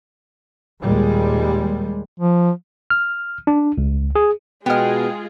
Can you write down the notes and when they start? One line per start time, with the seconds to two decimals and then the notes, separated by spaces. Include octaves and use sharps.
0.80 D#2 A#2 G3 G#3
2.20 F3
2.90 F6
3.47 D4
3.78 C#2
4.16 G#4
4.66 B2 G#3 B3 F4 G#4 D#5 G5 F6